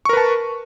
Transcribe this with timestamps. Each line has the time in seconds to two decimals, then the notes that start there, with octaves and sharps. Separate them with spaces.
0.05 C#6
0.09 A#4
0.13 B4
0.17 A5